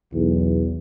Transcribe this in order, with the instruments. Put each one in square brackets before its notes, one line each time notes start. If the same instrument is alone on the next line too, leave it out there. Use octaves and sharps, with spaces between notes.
[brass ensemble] B1 E2